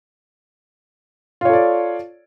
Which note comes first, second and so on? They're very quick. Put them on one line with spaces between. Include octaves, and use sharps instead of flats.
F4 C#5 A4 D5